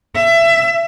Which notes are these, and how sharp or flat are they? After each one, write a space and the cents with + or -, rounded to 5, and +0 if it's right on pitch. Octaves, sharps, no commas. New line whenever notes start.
E5 +25